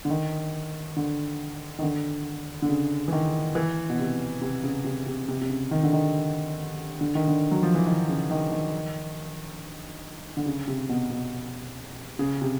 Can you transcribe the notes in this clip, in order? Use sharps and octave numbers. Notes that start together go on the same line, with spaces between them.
D3
D#3
D3
D#3
D3
D3
C#3
E3
D#3
E3
B2
C3
C3
C#3
C3
C3
C3
C3
C#3
D#3
D3
D#3
D3
D#3
D3
F#3
F3
E3
D#3
C#3
D#3
D#3
D3
C#3
C3
B2
B2
C#3
C3